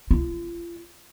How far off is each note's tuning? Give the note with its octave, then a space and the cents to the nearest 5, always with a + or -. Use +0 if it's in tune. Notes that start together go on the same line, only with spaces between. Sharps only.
F4 -40